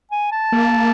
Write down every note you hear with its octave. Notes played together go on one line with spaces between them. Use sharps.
G#5
A5
A#3